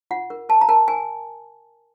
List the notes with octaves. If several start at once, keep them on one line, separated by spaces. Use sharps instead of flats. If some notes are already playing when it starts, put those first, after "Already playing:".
F4 F#5
A#4
A#4 A5
A#5
A#4 A5
A#4 G#5